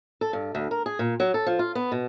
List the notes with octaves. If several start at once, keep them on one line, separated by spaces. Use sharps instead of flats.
A4
G2
D2
A#4
G#4
A#2
F#3
A4
F3
F4
B3
B2